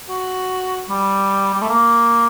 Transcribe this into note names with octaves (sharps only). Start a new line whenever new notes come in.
F#4
G3
G3
A3
A#3